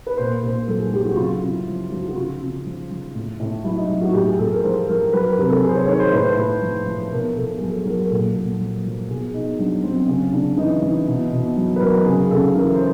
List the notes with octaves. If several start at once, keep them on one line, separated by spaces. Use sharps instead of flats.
B4
A#2 C5
A#2 C5
F#3 A4
G#4
F#3 G4
F#4
C#3 F4
C#3 E4
F3
F3 F#4
F#4
C#3 F4
C#3
F3
F3
A2
A2
F#3 E4
D#4
F#3
F#4
A2 G4
G#4
A2 A4
A#4
F3 C5
F3 A#4
F#3 B4
A#4
C3 A#4
A4
C3 G#4
C5
C#5
D#3 C#5
C5
A2 B4
C5
B4
A2
F3
F3
B2 A#4
B2 A4
F#3 G#4
A4
F#3 A#4
A#4
A#2 A4
A#2
F3
F3
B2 G#4
B2 D#4
F#3 D4
F#3 C4
C#3 C#4
C#3 D4
E3 D#4
E3
B2
B2
F#3
B4
F#3 A#4
C#3 G#4
C#3 A4
E3 A#4
C5